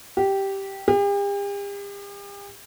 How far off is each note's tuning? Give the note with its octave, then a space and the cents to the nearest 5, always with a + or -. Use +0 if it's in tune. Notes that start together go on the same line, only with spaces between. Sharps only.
G4 -5
G4 +45